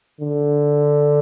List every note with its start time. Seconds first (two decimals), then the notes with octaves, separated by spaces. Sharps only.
0.21 D3